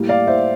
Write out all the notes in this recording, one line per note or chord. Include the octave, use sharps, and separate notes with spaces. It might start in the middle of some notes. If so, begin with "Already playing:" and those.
Already playing: A2 G3 A#3
D5 F5
C5 E5